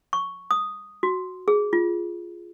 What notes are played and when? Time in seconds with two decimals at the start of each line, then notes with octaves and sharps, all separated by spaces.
0.13 C#6
0.51 D#6
1.03 F#4
1.48 G#4
1.73 F4